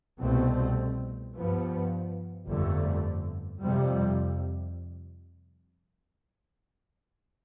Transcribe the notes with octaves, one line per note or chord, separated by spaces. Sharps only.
C2 B2 A3 C4
G2 F3 B3
G1 F2 D3 A3
F2 C3 G3